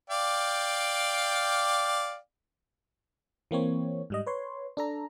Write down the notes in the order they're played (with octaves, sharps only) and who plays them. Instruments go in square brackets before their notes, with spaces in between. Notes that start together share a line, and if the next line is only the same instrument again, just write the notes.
[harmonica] D5 F5 G5
[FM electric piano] E3 A#3 C4 C#5
G#2 G3 D#5
B4 C#5 C6
D4 A4 A#5